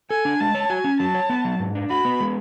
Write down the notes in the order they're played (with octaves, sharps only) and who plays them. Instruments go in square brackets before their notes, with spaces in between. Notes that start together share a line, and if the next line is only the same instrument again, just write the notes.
[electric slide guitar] A4 [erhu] G#5
[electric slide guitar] D4
[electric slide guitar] G#3 [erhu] A5
[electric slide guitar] C#5
[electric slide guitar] F#4 [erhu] G#5
[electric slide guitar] C#4
[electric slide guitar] F#3 [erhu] A5
[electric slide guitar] C#5
B3
F#3
G#2
D4
[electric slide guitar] F#4 [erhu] B5
[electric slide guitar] B3
G#3